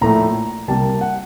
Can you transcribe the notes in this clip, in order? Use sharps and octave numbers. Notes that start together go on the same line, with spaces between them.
A#1 A2 A3 A#5
C2 C3 G3 A#3 A5
F#5